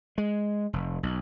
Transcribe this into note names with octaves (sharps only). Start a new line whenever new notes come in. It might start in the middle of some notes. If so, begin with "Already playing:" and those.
G#3
F1
B1